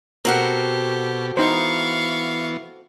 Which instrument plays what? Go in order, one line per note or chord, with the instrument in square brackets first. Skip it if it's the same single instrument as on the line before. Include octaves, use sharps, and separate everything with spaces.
[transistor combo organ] B2 [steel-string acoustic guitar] C4 F#4 A4 [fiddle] G4 [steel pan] A#4 F#5
[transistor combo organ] E3 B3 [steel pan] D#4 C5 [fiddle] F5 C#6